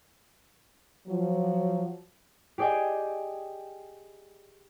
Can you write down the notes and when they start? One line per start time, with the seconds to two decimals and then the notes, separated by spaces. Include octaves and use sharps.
1.07 F3 F#3
2.58 G4 G#4 D5 D#5 G5 G#5